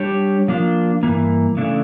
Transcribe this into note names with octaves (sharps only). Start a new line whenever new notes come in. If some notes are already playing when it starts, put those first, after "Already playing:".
Already playing: G3 D4 G4 C#5
F3 A#3 D4 F4
G2 E3 A#3
C#3 E3 A3 D4